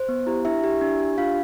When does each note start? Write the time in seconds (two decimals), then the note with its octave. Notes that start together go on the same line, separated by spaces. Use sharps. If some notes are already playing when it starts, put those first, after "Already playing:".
Already playing: C5
0.09 B3
0.27 E4 G4
0.45 D4 E4 E5
0.64 G4
0.81 D4
1.00 G4
1.18 D4 F4 F5